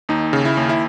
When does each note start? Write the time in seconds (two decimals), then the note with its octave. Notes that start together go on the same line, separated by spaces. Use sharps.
0.09 D#2 D#4
0.33 C#3
0.45 E4
0.57 D#2
0.69 E4